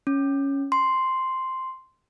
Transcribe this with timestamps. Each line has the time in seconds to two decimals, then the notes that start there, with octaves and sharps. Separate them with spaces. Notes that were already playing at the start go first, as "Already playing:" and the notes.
0.07 C#4
0.72 C6